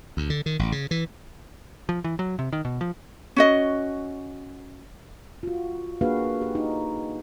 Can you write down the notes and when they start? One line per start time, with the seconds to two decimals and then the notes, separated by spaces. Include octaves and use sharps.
0.17 D2
0.30 D3
0.46 D#3
0.59 A1
0.72 C#3
0.91 E3
1.89 F3
2.04 E3
2.19 F#3
2.39 C3
2.53 D#3
2.65 B2
2.81 F3
3.36 C#4 F#4 D#5
5.43 F4 F#4
6.01 A#3 D4 F#4 G#4 B4 F5
6.42 G4
6.55 D#4